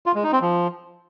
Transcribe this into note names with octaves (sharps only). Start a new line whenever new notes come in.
F4
G#3
D#4
C4
F3